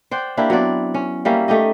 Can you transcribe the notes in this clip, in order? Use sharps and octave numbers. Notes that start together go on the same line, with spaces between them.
C5 D5 F#5 G5
A#3 D4 E4 G4
F#3 B3 C4 D5
C#4
G3 A#3 C#4 E5
A3 D#4 G4 D#5